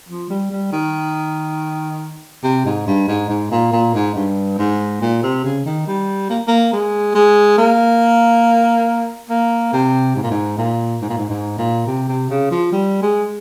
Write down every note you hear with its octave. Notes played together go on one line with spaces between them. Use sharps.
F3
G3
G3
D#3
C3
G#2
G2
G#2
G#2
A#2
A#2
G#2
G2
G#2
A#2
C3
C#3
D#3
G3
A#3
A#3
G#3
G#3
A#3
A#3
C3
G#2
A#2
G#2
A#2
G#2
A#2
G#2
G#2
A#2
C3
C3
C#3
F3
G3
G#3